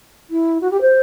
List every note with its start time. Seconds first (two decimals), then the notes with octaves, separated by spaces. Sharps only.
0.30 E4
0.61 F#4
0.70 G4
0.81 C5